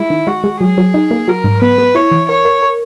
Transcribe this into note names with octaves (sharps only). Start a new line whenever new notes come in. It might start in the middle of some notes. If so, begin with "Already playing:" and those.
Already playing: G#3 E4
D#3
G#3 F#4
G#3
F#3 G#4
F#3
D#4
A#3
F#3 A#4
G#2
B3 B4
B3
E4 C#5
E3
A#4 C#5
A#4
A#4